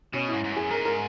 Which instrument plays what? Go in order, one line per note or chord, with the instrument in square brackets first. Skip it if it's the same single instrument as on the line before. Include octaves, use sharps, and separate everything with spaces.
[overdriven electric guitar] B2 [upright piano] C#4
[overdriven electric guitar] G#2 [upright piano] E4
[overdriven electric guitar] G#2
F#2
[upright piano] G#4
[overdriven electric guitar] G#2 [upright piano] A#4
[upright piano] A#4